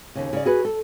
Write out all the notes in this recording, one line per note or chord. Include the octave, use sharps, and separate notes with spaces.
D#2 C#3
C#3 D5
F#4 G#4 B4
A4